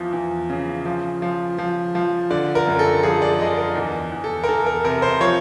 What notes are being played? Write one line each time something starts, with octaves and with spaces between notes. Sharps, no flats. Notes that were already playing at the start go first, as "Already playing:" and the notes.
Already playing: E2 F3
E2
C#3
F3
F3
F3
F3
D3 D5
A#4
F#2
A4
F3 G#4
D5
D3 D#5
A#4
E2
E2
A4
A#4
E2 A4
A#4
C3 A#4
C5
F3 C#5